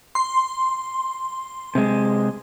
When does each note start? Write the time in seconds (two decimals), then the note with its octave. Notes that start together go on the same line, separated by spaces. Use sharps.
0.15 C6
1.75 C3 G#3